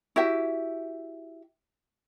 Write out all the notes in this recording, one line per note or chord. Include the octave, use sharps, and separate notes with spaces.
E4 F#4 G4 E5